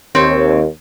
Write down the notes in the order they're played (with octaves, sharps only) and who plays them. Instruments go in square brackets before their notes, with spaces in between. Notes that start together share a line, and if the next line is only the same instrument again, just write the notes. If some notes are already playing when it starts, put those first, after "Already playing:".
[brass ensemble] D#2 [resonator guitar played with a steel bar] C4 C#5